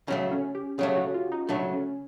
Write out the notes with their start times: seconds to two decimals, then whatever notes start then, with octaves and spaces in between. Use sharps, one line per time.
0.08 C#3 F#3 A3 C#4
0.31 C#4
0.55 G4
0.79 C#3 F#3 A3 G#4
0.97 F#4
1.14 F4
1.32 D#4
1.49 C#3 F#3 A3 D4
1.73 C#4